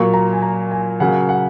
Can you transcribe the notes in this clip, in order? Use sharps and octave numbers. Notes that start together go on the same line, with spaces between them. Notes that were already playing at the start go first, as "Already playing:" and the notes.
Already playing: A#2 F#3 A#3 C#6
A#5
G#5
A#5
G#5
C#3 F#3 A#3 F#5
F#5